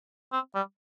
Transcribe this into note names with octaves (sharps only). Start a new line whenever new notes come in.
C4
G3